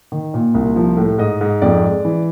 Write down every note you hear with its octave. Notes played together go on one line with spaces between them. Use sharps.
D#3
A#2
C2
F3
A2
G#2 D#5
G#2
F2 D5
G#3
E3